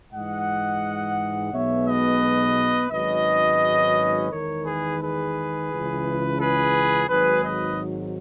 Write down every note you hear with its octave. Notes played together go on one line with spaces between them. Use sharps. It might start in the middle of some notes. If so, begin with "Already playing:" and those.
G#2 E3 G#3 D#5 F#5
B1 B2 G#3 B3 C#5 E5
B4 D#5
G#1 G#2 F#3 C#4 B4 D#5
E2 D#3 G#3 A#4 C#5
G#4 B4
G#4 B4
C#2 C#3 E3
G#4 B4
G#1 G#2 F#3 G#4 B4
B4 D#5